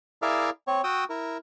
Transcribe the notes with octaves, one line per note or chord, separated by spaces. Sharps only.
E4 G#4 A#4 D5 E5 F5
C4 C#5
F#4 G5 D#6 E6
E4 A#4